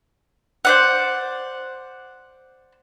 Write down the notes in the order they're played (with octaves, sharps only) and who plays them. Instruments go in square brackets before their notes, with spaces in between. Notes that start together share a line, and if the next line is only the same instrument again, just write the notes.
[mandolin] C5 D5 F#5